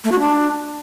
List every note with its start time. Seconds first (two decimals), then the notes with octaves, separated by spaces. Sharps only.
0.04 A3
0.12 F#4
0.19 D4